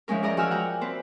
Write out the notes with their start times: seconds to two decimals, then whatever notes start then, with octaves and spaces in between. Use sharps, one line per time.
0.08 E3 F3 G#3 C#4 A#4
0.23 G#4 A#4 D5 D#5 A#5 D#6
0.37 F3 F#4 G#4 G#5 E6 F6
0.51 F#5 G5 A#5
0.81 C4 B4 C5